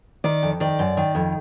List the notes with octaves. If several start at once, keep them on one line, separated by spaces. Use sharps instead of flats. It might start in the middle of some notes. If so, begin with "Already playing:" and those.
D#3 D5
F2
D#3 D5
F#2
D#3
F2